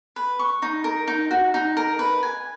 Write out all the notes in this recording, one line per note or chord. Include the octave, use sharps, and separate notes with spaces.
B4
C#6
D#4
A#4
D#4
F#4
D#4
A#4
B4
G#5